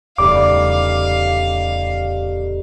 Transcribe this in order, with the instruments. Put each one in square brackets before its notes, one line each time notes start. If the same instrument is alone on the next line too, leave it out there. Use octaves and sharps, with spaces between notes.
[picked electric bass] D1 E2 C#3 [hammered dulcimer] G3 A3 D#4 [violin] F5 [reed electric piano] D6